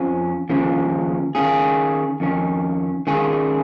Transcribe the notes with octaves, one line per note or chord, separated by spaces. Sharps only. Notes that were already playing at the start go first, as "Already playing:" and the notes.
Already playing: F2 F3 C#4
D#2 C#3 F3 C#4
D#3 C#4 G#4
F2 D#3 C#4
D#3 C#4 G#4